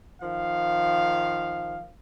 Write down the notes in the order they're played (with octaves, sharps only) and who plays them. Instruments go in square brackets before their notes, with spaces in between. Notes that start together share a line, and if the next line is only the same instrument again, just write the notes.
[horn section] D#3 F3 F5